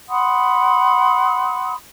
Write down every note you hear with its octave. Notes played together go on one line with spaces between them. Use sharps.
F#5 B5 C6 D#6